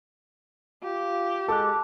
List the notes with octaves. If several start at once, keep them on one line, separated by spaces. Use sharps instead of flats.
F4 G4
G#3 A4 A5 D6 F#6